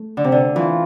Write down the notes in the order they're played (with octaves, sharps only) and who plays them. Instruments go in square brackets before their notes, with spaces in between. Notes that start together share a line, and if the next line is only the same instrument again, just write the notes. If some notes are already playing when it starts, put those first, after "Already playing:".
Already playing: [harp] A3
D3
C3
D3
[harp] E3 [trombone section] F4